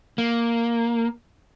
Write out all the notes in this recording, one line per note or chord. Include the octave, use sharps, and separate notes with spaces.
A#3